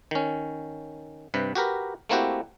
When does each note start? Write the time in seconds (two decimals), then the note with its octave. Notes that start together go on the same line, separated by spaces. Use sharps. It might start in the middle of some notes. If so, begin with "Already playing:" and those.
0.11 D#3 C#4
1.34 G2 C3 B4
1.55 F#4 G4 A#4 B4
2.09 A3 A#3 C4 E4 F#4 G4